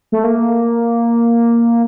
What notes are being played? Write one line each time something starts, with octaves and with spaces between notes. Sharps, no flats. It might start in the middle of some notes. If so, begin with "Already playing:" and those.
A3
A#3